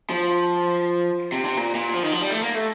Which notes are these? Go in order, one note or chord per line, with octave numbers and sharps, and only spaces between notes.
F3
C3
C3
A#2
A#2
F3
D#3
F3
G3
A3
A#3
A3